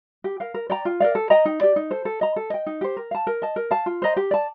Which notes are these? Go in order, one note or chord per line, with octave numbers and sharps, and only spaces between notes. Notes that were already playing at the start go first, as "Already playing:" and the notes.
G4
A#4 F5
A#4
D5 G5 A#5
F4
A#4 D5 F5
A4
D#5 G5 A#5
D#4
G4 D5
D#4
A4 C5
A4
D#5 A#5
A4
D#5 G5
D#4
G4 C5
A#4
F5 A5
A#4
D#5 A5
A#4
F5 A5
F4
C5 D#5 A#5
G4
D5 A5